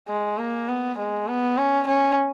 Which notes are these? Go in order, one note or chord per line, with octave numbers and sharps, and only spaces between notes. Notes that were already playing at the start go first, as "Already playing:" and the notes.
G#3
A#3
B3
G#3
B3
C#4
C#4